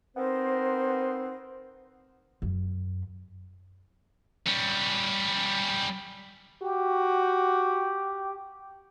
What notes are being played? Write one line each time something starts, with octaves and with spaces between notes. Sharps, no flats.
B3 C4 D#4 A#4 C5
F#2
G3 C#4
F#4 G4